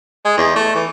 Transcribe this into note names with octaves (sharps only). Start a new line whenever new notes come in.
G#3
E2
A3
E3